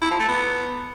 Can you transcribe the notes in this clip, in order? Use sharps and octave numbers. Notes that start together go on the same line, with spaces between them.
E4
F3
A3
B3